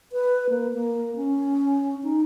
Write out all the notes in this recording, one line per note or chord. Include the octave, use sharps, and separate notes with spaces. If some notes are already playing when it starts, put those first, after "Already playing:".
B4
A#3
A#3
C#4
D#4